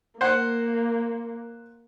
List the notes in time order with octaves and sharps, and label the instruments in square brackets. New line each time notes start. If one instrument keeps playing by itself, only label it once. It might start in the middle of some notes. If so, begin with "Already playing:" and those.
[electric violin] A#3 [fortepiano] C5 F#5